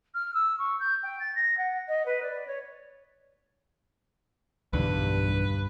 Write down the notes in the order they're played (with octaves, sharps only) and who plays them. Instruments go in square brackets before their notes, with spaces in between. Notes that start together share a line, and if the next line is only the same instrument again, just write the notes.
[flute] F6
E6
C#6
G6
G5
A6
A#6
F#5
D#5
B4
D5
C#5
[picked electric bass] B1 E2 D3 [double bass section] G2 [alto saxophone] B4